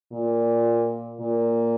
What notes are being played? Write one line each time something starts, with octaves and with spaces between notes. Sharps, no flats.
A#2
A#2